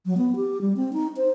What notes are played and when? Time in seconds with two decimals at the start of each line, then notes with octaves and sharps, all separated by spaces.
0.06 F#3
0.17 B3
0.36 G4
0.61 G3
0.76 C4
0.93 D#4
1.17 C5